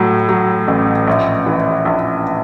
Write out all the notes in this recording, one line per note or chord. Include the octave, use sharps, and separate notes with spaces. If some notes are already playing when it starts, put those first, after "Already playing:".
Already playing: A2 F#3
F#3
A1
A#1
E3
A#1